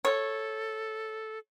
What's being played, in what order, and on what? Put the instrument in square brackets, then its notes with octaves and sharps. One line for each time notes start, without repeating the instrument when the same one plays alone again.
[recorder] A4 [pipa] C#5